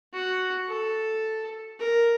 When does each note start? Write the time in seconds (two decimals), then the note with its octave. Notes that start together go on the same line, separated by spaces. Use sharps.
0.14 F#4
0.68 A4
1.79 A#4